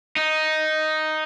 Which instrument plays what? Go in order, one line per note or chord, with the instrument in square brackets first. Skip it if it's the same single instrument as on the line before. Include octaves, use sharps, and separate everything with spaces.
[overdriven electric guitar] D#4